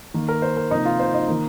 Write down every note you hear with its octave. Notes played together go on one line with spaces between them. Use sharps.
D#3 A#3
A#4
C5
A#4
C3 F3 A#3 D#4 D#5
F4 F5
C5
D#4 D#5
D#3 A#3